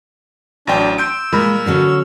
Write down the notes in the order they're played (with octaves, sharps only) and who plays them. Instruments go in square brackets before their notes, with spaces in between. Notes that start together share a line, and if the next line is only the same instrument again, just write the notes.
[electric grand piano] A1 F#3 G5 [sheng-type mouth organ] D4
[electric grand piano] C6 G6 D7 [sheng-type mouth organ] E6
[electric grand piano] A#2 A#4 B5 [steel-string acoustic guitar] G#3
[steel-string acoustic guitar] D3 F#3 C#4